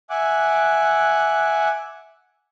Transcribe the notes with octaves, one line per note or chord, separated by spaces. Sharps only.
E5 F#5 G#5 D6 F#6